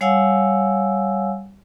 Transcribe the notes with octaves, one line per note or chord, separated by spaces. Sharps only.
G3 C#5 F5 F#5 G#5 E6